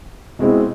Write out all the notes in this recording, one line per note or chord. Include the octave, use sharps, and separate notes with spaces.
B2 G#3 C4 E4